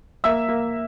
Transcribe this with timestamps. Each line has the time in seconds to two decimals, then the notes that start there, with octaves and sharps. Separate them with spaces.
0.24 A#3 E5 E6
0.48 A#3